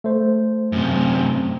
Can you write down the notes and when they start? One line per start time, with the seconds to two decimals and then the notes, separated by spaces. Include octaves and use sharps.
0.04 A3 C5
0.72 F#2 C3